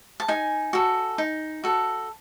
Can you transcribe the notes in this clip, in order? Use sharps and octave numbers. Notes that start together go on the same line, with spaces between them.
A5
D#4 G#5
F#4 A4
D#4
F#4 A4